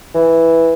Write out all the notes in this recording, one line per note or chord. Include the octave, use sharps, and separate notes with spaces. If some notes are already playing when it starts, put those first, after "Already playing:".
E3